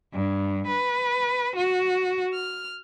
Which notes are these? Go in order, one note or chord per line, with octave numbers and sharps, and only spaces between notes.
G2
B4
F#4
F6